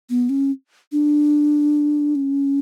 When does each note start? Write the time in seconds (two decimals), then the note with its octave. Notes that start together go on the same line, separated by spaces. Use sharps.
0.10 B3
0.29 C#4
0.92 D4
2.15 C#4